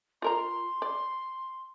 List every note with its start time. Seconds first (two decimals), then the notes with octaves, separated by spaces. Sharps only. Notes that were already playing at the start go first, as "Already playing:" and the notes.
0.22 F4 A#4 A#5 C6
0.82 D5